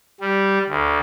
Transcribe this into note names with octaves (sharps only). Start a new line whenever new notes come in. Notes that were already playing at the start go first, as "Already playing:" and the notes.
G3
D2